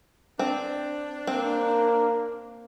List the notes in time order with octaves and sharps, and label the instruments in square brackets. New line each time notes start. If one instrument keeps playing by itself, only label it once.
[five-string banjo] C4 [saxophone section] D4
[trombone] A#3 [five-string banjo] C4